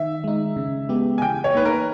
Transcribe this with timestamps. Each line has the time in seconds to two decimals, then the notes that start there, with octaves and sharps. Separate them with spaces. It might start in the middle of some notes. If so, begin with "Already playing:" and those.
Already playing: D#3 E5
0.24 G#3 D#4
0.56 C#3
0.89 G#3 B3 G4
1.18 G#5
1.22 E3 G5
1.44 C#5
1.54 A#3 D#4 B4
1.65 A#4